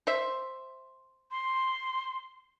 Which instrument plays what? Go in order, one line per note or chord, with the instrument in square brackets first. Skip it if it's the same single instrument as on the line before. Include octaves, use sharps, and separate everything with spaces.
[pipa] C5 E5
[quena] C6